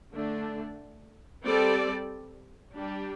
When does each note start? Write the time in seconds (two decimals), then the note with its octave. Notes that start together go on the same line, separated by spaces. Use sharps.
0.13 D3 A3 D4
1.44 G3 C4 A4 D5
2.74 G3 D4 G4